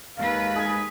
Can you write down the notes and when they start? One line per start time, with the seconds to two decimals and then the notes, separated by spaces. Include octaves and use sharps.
0.18 D#2 G#3 D#4 B4 F5
0.56 G#4 G#5